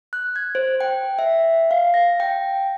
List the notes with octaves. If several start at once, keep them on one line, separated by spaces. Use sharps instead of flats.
F#6
G#6
C5
G5
E5
F5
A#6
G5